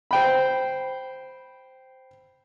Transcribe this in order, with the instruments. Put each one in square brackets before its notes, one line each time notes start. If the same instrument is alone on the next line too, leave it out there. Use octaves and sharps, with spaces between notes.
[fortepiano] C5 G5 B5